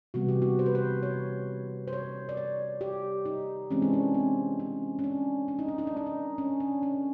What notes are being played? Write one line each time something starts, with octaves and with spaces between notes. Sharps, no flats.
C3 E3 G3 B3 F#4
G4
F#4
C5
B4
C5
C#5
C5
C#5
D5
C#5
G4
D#4
E3 G#3 C4 C#4
D4
C#4
C4
C#4
C#4
D4
D4
D#4
D4
D#4
D4
D#4
D4
C#4
D4
C#4